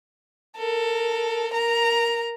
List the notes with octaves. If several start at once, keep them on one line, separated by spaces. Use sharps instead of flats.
A4 A#4
A#4 A#5